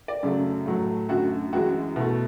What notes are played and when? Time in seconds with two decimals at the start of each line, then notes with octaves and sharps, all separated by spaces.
0.08 D5
0.23 F#2 C#3 F#3 A3
0.66 A2 F#3 A3
1.09 F#2 D3 A3 F#4
1.52 F#2 E3 G#3 F#4
1.96 B2 A3 E4